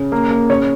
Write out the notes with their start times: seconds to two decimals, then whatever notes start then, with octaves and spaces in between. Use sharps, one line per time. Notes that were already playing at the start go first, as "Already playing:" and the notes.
Already playing: C#3
0.12 A#3
0.31 A#3
0.49 C#3 C#5